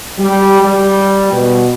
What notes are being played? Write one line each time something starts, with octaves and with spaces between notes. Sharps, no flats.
G3
G3
B2